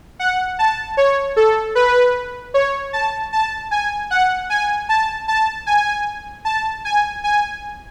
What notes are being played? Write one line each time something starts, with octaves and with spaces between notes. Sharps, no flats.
F#5
A5
C#5
A4
B4
C#5
A5
A5
G#5
F#5
G#5
A5
A5
G#5
A5
G#5
G#5